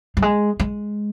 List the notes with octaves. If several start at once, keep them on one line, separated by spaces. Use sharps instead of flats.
G3
G#3
G#3